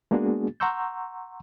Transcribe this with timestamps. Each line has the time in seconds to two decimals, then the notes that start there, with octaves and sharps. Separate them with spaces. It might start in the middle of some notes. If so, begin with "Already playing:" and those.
0.11 G#3 A#3 B3 D4 F#4 G#4
0.60 F#5 A#5 C6 C#6 E6 G6